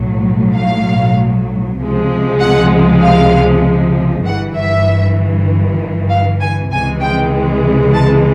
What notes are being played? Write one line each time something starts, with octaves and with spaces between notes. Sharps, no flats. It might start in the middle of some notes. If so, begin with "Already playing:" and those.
Already playing: B1 A2 F#3
F5
C#2 C3 F3 G#3
F#5
F5
G1 G2 E3 F#5
E5
F5
G#5
C#2 C3 E3 G#3 G#5
G5
A5